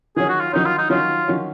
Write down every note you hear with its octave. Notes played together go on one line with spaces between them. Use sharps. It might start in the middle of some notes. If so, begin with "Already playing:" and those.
D#3 F#3 C#4 G#4
F#4
F4
D#3 F#3 C#4 D#4
F4
D#4
D#3 F#3 C#4 F4
D#3 F#3 C#4